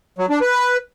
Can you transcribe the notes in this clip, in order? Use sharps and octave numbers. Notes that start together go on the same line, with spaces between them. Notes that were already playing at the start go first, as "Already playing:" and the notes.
F#3
D4
B4